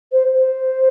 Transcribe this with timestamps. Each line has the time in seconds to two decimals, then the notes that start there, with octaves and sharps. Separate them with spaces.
0.12 C5
0.34 C5